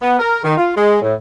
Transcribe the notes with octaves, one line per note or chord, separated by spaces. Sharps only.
B3
A#4
D#3
F4
G#3
A2